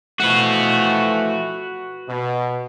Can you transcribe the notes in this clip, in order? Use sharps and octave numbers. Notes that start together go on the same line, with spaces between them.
E3 F3 A3 F#4 B4
B2